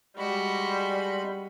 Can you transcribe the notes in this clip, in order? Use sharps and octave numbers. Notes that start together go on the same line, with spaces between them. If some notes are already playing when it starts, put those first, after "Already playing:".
G3 G#3 F#4 B5